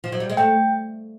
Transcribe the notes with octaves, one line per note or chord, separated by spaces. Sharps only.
F3
F#3
G3
G#3
A3 G5